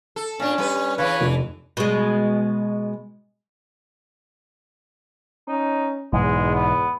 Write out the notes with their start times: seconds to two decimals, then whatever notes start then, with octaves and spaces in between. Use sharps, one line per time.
0.16 A4
0.40 A#2 C#4 D4
0.58 G3 B4
0.98 C#3 E3 B4 C#5 F5
1.21 F1
1.77 B2 G#3
5.48 C#4 D#4
6.13 B1 E2 G#2 E3 G#3
6.54 B3